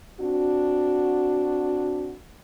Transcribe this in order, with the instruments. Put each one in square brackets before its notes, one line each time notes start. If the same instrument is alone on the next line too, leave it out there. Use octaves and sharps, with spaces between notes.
[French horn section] C4 D4 F#4